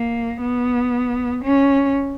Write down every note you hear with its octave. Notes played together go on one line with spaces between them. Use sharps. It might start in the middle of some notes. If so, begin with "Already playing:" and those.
Already playing: A#3
B3
C#4